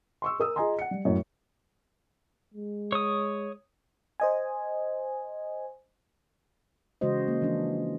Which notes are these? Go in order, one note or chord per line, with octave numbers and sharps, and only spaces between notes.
C6 C#6 E6
A#4 D#6 E6
F4 G#4 D#5 G#5 A#5 C6
F#5 C#7
G3
F#2 A2 F#3
G#3
C#5 D#6
C5 D#5 G#5
C#3 E3 G#3 F#4 C5 D#5
A#3
E3 F3 D4